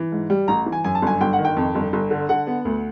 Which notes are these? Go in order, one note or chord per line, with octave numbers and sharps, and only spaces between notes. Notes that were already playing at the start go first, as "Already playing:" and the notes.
Already playing: E3
G#2
G3
A1 A#5
E3
G#5
F#2 G#5
A5
G1 G#5
G1 G5
F#5
D#3
G5
F2
G1
G1
D3
D3 F#5
B3
D2